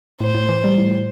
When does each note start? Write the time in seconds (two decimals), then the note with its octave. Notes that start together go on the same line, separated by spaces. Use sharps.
0.21 A2 C5
0.35 A2
0.49 E3
0.64 G3
0.78 A2
0.91 A2